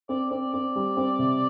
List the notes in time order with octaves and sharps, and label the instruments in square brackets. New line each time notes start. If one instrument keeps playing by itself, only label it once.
[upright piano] C4 [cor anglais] D5
[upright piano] C4 [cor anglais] D5
[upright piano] C4 [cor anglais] D5
[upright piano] G3
C4
C3